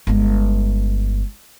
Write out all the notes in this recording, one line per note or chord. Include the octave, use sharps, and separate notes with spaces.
G1 G#3